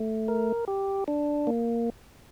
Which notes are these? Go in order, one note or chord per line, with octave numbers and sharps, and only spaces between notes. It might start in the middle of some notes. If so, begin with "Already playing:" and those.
Already playing: A3
A#4
G4
D4
A#3